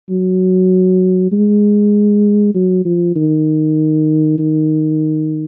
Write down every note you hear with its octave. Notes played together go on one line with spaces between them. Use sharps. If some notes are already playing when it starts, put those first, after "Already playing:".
F#3
G#3
F#3
F3
D#3
D#3